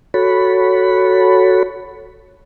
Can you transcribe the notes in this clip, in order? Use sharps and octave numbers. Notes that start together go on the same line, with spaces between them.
F#4 A4 C#5 B5